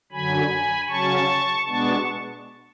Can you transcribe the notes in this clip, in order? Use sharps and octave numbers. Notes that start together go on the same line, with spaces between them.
F#2 D3 F#3 G#5 B5
C#3 F#3 C#4 A5 C#6
B2 G#3 B3 D4 A5 C#6